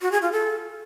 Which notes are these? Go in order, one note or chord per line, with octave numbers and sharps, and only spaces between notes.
F#4
G#4
F4
A4